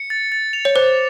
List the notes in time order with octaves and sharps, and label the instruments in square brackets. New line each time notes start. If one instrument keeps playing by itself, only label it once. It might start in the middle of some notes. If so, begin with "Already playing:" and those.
Already playing: [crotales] C#7
A6
A6
F7
[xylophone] C#5
[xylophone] C5 [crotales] D6